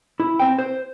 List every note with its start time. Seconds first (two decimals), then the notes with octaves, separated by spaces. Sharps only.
0.20 E4
0.39 C4 G5
0.58 C5